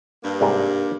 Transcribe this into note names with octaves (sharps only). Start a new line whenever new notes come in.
G2 A#3
C2 G#2 G3